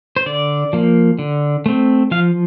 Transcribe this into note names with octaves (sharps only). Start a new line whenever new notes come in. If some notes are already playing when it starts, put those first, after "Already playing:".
C5
D3 D5
F3 A#3
D3
A3 C4
F3 F5